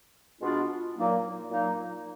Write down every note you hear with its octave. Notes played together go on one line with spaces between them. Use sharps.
B2 G#3 B3 D4 F4
A#2 F#3 A#3 D#4
A#2 F#3 A#3 D#4